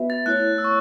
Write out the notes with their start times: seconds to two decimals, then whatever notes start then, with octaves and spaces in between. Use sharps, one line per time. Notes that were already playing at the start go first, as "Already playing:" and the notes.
Already playing: B3 F#4 B4 E5
0.10 A6
0.26 A3 E4 C#5 F#6
0.58 E6
0.64 C#6